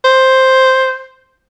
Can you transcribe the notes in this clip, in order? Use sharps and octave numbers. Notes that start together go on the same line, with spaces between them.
C5